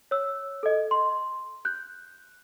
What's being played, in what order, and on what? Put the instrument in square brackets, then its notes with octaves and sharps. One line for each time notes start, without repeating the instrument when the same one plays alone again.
[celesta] C#5 E6
A4 D#5
C6
F#6 G6